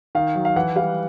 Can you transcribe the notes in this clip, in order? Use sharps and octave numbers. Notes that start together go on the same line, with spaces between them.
D#3 F5
F#3
F5
E3 F#5
G3 F5